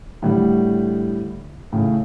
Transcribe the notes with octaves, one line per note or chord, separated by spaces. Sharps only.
A2 D3 G3
A2 C#3